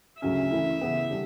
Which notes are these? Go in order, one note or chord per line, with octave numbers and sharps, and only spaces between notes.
D2 C#3 F#3 C#4 E5
E3 A3 C#4 E4
C#3 E3 B3
D3 G3